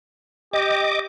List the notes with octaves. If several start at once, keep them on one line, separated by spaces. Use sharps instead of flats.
G4 D#5 D6